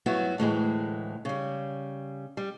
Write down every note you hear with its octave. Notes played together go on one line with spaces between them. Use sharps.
G2 F#3 B3 E4 F#4
D2 A2 E3 G#3
C#3 G3
G3